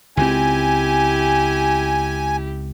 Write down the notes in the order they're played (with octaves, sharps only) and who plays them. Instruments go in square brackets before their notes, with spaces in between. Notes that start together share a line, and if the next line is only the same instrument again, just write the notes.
[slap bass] C#2 C4 [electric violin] E4 G4 [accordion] G#5